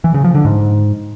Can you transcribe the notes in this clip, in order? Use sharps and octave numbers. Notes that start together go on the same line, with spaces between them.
E3
C#3
F3
D3
G#2